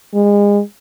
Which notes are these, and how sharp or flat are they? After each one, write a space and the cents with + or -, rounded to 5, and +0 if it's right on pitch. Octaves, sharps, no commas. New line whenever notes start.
G#3 -30